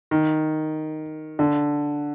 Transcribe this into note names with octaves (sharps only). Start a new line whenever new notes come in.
D#3
D3